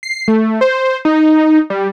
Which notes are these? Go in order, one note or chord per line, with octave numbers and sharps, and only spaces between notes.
C7
A3
C5
D#4
G3